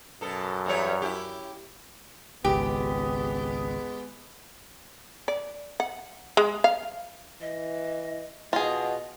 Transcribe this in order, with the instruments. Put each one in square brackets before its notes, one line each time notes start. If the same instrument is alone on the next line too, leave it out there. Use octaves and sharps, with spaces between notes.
[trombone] F#2 [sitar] B2 A4
[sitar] E2 G3 C#5
E4 G4
[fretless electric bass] G#1 C#2 [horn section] G#3 B3 [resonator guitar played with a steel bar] G4
[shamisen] D5
F#5
G#3
F5
[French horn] E3 [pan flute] D#5
[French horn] B2 [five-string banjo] F4 G#4 [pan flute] D#5